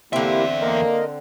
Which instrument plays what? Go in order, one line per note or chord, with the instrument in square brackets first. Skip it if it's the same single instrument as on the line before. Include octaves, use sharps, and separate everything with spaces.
[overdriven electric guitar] E2 E5 [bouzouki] D3 C4 [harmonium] A#3 E4 G4
[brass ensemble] A#3 [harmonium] A#4 D#5